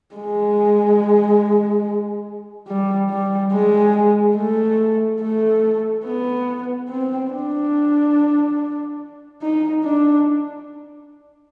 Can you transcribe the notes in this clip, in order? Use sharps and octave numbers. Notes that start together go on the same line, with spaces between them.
G#3
G3
G3
G#3
A3
A3
B3
C4
D4
D#4
D4